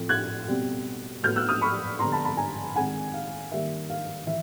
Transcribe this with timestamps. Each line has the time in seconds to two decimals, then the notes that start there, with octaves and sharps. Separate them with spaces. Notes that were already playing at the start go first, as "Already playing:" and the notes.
Already playing: A2 F3 A3 C4
0.09 F#6 G#6
0.48 B2 G3 C4
1.23 A2 F#3 B3 F6 G6
1.36 E6 F#6
1.49 D#6 F6
1.61 B5 C#6
1.99 D3 G3 B3 A#5 C6
2.12 A5 B5
2.24 A5 B5
2.37 G#5 A#5
2.76 D#3 G#3 C4 F#5 G#5
3.14 F5
3.51 D#3 G3 A#3 E5
3.90 F5
4.27 E3 E5